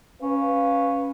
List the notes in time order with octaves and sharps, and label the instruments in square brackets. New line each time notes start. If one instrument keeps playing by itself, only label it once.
[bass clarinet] C#4 [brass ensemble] B4 F5